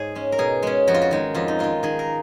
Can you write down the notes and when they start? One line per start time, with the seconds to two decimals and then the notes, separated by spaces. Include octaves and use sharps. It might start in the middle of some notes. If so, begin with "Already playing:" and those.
Already playing: G#2 G#4 C#5
0.15 G#3 C#4
0.32 A#4
0.38 B2 G#4
0.63 G#3 C#4
0.87 F2 F#4
0.94 F4
1.02 F#4
1.11 D#3 G#3
1.34 F2 F4
1.48 D#4
1.59 D#3 G#3 F4
1.83 D#3 G#4
1.99 A#4